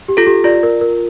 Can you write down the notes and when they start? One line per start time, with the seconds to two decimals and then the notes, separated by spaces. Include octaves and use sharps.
0.08 G4
0.17 F4 A4
0.27 G4
0.44 F4 D5
0.63 A#4
0.81 A#4